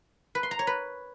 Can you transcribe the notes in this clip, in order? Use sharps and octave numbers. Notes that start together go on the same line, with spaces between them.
B4
C6
A#5
C#5
B4